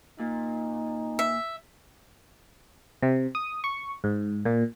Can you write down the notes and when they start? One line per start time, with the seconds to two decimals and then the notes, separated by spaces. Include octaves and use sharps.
0.20 A#2 D#4
1.19 E5
3.03 C3
3.35 D#6
3.64 C#6
4.04 G#2
4.45 A#2